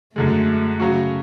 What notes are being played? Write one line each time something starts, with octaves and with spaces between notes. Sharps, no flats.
F#2 D3 G#3 A3
C#3 F#3 C#4 F#4